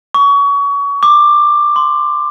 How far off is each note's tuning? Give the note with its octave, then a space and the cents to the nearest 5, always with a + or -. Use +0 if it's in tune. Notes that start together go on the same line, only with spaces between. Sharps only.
C#6 +30
D6 +15
C6 -5